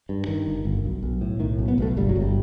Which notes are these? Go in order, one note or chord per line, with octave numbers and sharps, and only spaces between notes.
G2
G2 D#3
G1
G1
B1
B1
A2
A2 D#3
B1
B3
B1 A3
G1 G3
F#3
G1
G3